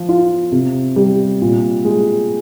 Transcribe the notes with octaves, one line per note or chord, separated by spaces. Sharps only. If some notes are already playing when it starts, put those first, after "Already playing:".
Already playing: F3
F4
C3
G3
A#2
G#3